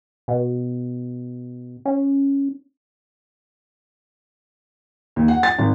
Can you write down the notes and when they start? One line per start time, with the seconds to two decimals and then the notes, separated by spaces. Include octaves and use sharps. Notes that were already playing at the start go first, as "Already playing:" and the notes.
0.28 B2
1.85 C#4
5.16 D#2
5.28 F#5
5.43 A6
5.58 G#1